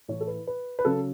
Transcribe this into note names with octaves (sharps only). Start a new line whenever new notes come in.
A2 E3 C#5
A4
B4
B4
B4
C#3 F#3 A4